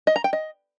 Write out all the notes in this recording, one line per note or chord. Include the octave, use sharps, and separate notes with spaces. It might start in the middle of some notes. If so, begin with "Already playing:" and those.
D#5
A#5
G5
D#5